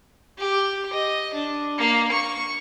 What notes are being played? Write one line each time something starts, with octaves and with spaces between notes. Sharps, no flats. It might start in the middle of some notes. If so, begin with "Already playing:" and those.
G4
D#5
D4
A#3
C#6